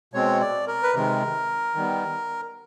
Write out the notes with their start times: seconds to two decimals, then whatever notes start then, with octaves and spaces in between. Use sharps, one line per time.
0.14 B2 G#3 C4 C#5
0.41 D5
0.67 A#4
0.83 B4
0.95 C3 D#3 G#3 A#4
1.75 D#3 G3 B3